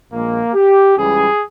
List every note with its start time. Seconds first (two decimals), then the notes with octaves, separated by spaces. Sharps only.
0.11 A#1 A#2 G#3 A#3
0.54 G4
0.97 C#2 C#3 E3 G3 G#4